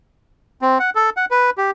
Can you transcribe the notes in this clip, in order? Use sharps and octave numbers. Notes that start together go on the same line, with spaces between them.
C4
F#5
A4
F#5
B4
G4